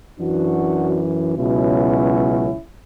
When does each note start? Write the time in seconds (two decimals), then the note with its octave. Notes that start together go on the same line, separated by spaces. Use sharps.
0.19 F#2 E3 D4 F#4
1.36 C#2 B2 F#3 C#4 E4